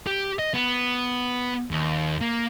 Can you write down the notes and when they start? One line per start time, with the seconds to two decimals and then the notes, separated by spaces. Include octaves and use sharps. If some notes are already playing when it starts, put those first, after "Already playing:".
0.07 G4
0.39 D#5
0.54 B3
1.71 D#2
2.21 A#3